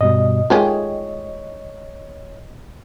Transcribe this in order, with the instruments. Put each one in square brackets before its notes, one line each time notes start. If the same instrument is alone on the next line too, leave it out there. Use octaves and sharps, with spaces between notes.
[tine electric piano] G2 B2 G3 [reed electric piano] D#5
[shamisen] D#3 G4 G#4 [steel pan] G#3 A3 F4 [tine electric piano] C#5